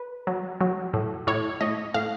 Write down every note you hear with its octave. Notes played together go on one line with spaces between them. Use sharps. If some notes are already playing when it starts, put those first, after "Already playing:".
Already playing: B4
F#3
F#3
A2
A2 C#5
A2 D#5
A2 F5